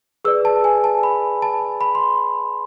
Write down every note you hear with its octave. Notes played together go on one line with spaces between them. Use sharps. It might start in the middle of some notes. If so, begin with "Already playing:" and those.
G#4 B4 D5 E6
A5
G#5
A5
B5
A5
B5
C6